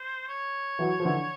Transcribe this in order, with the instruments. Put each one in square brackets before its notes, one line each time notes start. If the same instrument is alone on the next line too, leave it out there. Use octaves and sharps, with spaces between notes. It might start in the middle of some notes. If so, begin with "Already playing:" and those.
Already playing: [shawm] C5
C#5
[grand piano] E3 F#3
F3
D3 E3